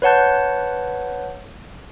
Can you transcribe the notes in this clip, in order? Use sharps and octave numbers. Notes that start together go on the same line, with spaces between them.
B4 C#5 F#5 A5 G6